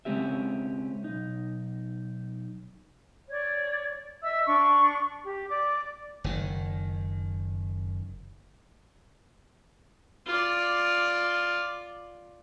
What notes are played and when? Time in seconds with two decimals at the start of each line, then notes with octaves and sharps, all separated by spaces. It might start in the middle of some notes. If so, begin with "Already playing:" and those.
0.05 C#3 G#3 C4 C#4 G4 E5
1.04 B1 D#4
3.29 C#5 D5
4.23 D#5 E5 E6
4.45 D4 C#6
5.24 G4
5.49 D5 D6
6.24 F#1 D#3
10.26 F4 D5